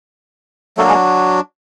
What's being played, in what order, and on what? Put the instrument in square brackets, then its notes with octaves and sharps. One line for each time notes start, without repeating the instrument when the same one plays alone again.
[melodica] F#3 A3 A#3 D4 F#4 A4
G#3 G#4